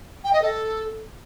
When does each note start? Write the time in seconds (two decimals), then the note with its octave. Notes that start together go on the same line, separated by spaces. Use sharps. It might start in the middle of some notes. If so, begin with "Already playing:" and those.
0.24 G5
0.33 D#5
0.42 A4